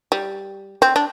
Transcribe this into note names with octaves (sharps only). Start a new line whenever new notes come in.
G3
C4
D4